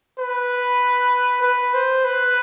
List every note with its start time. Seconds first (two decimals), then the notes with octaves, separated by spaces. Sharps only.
0.19 B4
1.42 B4
1.74 C5
2.05 B4